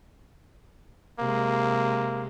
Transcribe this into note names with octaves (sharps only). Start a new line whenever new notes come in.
C3 G#3 A#3